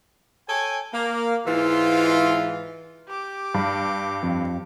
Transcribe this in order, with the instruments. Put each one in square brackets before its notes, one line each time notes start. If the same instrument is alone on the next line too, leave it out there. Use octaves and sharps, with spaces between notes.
[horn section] A4 C#5 G5 G#5
A#3
G#2 E3 F4
[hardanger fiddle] G4 D6
[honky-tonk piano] G2
[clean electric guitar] F2